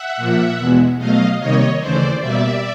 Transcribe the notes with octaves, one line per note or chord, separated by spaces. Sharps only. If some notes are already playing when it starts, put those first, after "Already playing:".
Already playing: E5 F#5
A#2 F3 A#3
E2 B2 G#3
B2 F#3 A3 D#5 F5
C3 D#3 G3 A#3 C#5 D#5
D#2 C#3 E3 A3 C5 D5
B2 G3 A#3 D5 E5